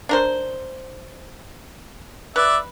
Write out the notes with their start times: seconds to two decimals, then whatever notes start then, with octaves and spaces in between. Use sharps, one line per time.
0.09 D4 A#4 C5
2.36 B4 D5 E5